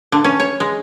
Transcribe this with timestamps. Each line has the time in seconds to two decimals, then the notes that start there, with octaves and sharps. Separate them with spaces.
0.12 D3
0.24 C#4
0.40 C#5
0.60 G#3